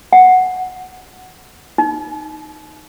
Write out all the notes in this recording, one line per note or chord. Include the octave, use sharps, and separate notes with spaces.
F#5
D#4